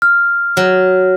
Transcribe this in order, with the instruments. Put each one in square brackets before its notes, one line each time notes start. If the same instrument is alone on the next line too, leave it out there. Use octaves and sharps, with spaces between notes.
[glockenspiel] F6
[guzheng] F#3